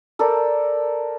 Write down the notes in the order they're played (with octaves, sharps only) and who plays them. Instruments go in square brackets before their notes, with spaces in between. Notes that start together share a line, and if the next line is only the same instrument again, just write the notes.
[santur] A4 A#4 C5 D5